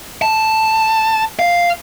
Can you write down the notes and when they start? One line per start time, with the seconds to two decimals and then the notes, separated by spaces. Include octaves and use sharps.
0.22 A5
1.39 F5